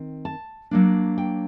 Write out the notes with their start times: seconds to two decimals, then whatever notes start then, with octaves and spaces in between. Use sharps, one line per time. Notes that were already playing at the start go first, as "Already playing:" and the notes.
Already playing: D#3 C4
0.25 A5
0.71 F#3 A#3 D4
1.18 G5